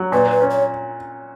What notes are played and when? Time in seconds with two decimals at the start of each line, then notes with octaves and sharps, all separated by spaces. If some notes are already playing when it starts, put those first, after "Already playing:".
Already playing: F#3
0.12 A#2 B4
0.31 B4
0.41 C#4
0.50 C#5